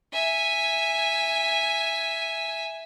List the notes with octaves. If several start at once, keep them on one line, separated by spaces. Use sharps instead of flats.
E5 G#5